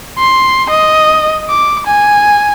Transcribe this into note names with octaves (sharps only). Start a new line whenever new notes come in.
C6
D#5
D6
G#5